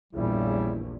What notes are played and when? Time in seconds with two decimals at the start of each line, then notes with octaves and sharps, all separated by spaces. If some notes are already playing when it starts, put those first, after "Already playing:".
0.13 A#1 E2 G2 C#3 G3 E4